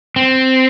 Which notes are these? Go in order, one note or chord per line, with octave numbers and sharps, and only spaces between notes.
C4